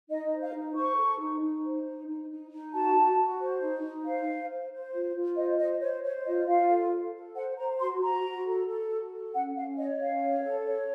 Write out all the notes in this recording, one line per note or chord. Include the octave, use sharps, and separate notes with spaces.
D#4 D#5
C5
F5
D#4
C5 C#6
A4
D#4
D#4
C5
D#4
D#4
D#4
D#4
F#4 A5
F#4
F#4
C5
D#4
D#4
C5 F5
C5
C5
C5
F4
F4
C5 D#5
C5 D#5
C5 C#5
C5 C#5
F4 D#5
F4 F5
A4
A4
A4
C5 F#5
C5 A#5
F#4 C6
F#4 A#5
F#4
A4
A4
F#4
A4
C#4 F#5
C#4 F5
C#5 D#5
C#4 F5
C#5
A4
C#5